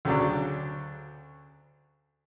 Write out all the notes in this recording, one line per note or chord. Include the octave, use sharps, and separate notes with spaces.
D2 C#3 F#3 D4